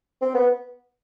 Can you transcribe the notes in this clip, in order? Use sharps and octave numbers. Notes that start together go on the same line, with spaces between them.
C4
B3